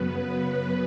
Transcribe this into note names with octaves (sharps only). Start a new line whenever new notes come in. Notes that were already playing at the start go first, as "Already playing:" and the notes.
Already playing: F#2 C#3 F#3 B3 B4